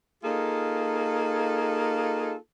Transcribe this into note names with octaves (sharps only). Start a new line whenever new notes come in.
A#3 D#4 F4 G#4 A4